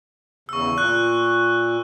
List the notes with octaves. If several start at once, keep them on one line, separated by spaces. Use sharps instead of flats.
E2 C#3 C#6 E6
A#2 F#6